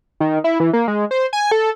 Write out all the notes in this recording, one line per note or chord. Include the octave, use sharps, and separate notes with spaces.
D#3
E4
E3
A#3
G#3
C5
G#5
A4